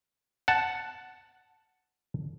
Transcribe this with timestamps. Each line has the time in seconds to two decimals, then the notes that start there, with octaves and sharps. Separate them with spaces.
0.48 F#5 A5